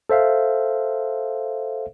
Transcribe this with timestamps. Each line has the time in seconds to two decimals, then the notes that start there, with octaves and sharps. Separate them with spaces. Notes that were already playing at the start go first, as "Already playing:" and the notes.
0.09 A4 C5 E5 F5